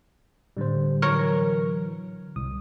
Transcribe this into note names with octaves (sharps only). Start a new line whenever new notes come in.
A2 D3 G3 C5
E3 F#3 A#4 C#5
C2 D#6